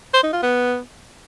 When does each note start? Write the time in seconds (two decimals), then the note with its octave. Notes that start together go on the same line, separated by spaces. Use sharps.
0.14 C5
0.23 D#4
0.33 F4
0.43 B3